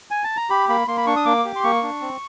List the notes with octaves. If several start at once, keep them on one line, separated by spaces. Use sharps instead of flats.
G#5
A5
A#5
G4 B5
A#3 B5
A#3 C6
B5
D4 C#6
D#6
A#3 D6
G4
C6
A#3 C#6
D4
C4